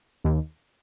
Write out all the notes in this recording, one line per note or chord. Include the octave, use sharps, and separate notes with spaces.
D#2